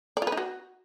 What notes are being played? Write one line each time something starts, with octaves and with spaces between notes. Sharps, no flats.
D5
F4
B4
D#4
F#4